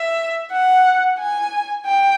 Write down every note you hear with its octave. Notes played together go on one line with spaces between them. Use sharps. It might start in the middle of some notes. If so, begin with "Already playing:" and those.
Already playing: E5
F#5
G#5
G5